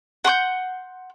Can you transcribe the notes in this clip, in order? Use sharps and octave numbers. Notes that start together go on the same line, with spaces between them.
F#5 C6 C#6 G6